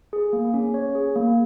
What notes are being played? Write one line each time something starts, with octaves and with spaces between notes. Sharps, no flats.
G#4
A#3
C#4
C#5
G#4
A#3